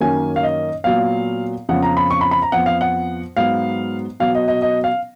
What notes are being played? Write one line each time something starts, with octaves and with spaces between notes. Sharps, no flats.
F#2 D#3 A#3 C#4 G#5
F5
D#5
A#2 F#3 B3 F5
F2 C#3 F3 B3 F#5
A#5
B5
C#6
B5
B5
A#5
F2 F3 B3 F#5
F5
F#5
G#2 F#3 B3 F5
B2 F#3 B3 F5
D#5
D#5
D#5
F5